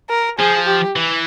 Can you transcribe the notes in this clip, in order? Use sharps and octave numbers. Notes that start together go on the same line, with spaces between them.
A#4
F3 G#4
G4
E3